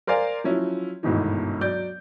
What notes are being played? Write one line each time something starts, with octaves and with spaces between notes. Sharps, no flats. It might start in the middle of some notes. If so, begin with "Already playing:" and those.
A#4 C5 D5 F5 G#5
F3 F#3 C#4 E4
G1 D2 G#2 B2 D#3 E3
F#3 D5 G6